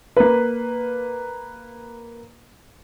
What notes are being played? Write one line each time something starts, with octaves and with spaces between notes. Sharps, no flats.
A#3 B4